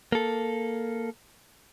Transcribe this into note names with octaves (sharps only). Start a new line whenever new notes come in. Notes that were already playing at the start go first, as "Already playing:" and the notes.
A#3 A4